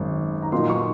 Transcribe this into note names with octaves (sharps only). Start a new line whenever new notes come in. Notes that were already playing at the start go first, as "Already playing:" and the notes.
Already playing: G#1 F#2
A#5
A#2 F#3 A#3 D#4 C6
C#6